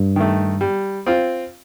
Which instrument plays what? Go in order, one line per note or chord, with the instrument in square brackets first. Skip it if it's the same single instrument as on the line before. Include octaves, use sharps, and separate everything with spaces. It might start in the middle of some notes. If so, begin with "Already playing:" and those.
Already playing: [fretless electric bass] G2
[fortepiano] D#3 A3
G3
C4 F4